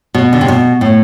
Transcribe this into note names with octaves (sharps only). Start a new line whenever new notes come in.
B2
D3
C3
B2
A2